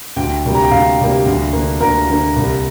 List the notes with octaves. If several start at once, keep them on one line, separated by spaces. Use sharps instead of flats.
D2 G5
C3 G3 A#3
A#5
G5
D2 F5
C3 G3 A#3
D2
D3 A#3
D2 A#4
D3 A#3
C2